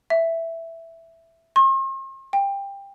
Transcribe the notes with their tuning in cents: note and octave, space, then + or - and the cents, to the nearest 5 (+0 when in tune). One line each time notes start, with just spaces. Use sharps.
E5 +5
C6 +45
G5 +20